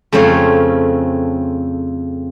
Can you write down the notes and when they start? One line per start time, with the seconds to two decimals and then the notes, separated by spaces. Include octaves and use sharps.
0.12 F2 C#3 A3 C4 C#5 F5